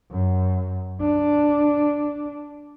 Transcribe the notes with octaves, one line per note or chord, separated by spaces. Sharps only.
F#2
D4